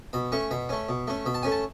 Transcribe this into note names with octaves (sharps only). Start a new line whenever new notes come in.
B2 B5
A3 C#4 C#6
B2 B5
A3 C#4
B2
A3 C#4
B2 B5
A5
A3 C#4 G#5
A5